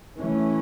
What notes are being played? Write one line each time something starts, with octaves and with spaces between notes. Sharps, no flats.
E3 A3 C#4